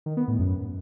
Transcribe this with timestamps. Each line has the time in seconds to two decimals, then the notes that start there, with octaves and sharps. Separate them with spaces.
0.06 D#3
0.17 B3
0.28 A2
0.39 F#2